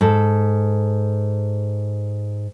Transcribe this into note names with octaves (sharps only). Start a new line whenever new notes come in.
G#2 A4